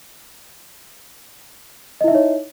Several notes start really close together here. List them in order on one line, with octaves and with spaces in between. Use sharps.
D#5 E4 E5 D#4 C#5